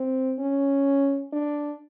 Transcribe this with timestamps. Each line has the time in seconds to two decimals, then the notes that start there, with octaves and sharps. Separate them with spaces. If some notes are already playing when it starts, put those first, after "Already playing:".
Already playing: C4
0.39 C#4
1.33 D4